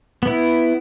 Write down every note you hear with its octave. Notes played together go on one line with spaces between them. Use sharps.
B3 E4